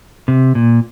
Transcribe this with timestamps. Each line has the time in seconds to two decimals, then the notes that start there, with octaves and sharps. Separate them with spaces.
0.28 C3
0.55 A#2